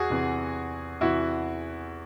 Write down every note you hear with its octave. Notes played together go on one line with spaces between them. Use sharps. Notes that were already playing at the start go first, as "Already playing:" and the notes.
Already playing: E2 F#4 G#4
E2 C3 E3
E2 C3 E3 E4 F#4